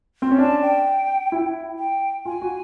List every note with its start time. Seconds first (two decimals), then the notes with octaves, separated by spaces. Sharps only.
0.22 C4
0.31 C#4
0.38 D4 A5
0.62 G5
1.32 E4
1.79 G5
2.25 F4 G#5
2.42 F#4